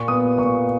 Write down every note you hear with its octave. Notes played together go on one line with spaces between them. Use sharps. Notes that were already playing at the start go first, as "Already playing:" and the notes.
Already playing: A#2 C#6
B3 D#6
A#2 C#6